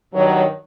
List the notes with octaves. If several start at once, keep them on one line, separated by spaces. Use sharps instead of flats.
G2 D#3 F#3